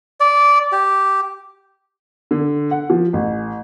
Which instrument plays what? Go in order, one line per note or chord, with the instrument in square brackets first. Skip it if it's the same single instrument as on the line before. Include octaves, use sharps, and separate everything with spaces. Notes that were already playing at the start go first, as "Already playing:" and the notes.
[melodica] D5
G4
[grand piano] D3
F#5
F3
A1